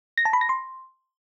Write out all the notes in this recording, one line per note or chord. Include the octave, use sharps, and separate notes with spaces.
A#6
A5
B5
A#6
C6